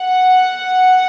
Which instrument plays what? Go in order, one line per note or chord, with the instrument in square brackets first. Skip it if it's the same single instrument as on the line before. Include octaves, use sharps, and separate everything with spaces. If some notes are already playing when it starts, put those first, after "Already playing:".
Already playing: [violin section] F#5